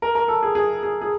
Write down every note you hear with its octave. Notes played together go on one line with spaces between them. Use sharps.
A#4
A#4
A4
G#4
G#4
G#4
G#4